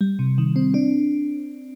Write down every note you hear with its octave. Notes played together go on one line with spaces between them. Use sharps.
G3
C3
D#3
C4
D4